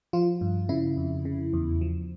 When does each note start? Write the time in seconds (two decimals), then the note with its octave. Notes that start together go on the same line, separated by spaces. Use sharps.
0.13 F3 F4
0.41 G2
0.69 C#3 E4
0.97 F2
1.25 C#3
1.53 E2
1.81 F3